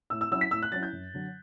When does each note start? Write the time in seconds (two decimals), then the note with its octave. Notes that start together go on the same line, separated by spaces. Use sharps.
0.10 A2 E6
0.21 E6
0.31 F#3 C#4 E4 E6
0.41 B6
0.51 A2 E6
0.62 F#6
0.72 F#3 C#4 E4 A6
0.83 G6
0.92 F#2
1.14 D3 F#3